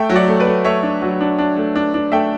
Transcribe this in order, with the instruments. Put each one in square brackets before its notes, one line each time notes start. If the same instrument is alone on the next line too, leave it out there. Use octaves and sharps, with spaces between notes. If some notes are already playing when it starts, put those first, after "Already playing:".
Already playing: [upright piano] A3 E5 G5
F#3
D5 F#5
A3
B4 D5
A3
A3 C#5 E5
D4
F#3
D4
D4
A3
D4
D4
A3 E5 G5